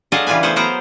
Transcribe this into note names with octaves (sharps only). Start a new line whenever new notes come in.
F#3 D4 F4 G#4 A4 D#5
C#3 E3 G3 F4 B4 G#5
A3 B3 G#4 C5 F#5
F#3 B3 A#4 C5 F#5 A#5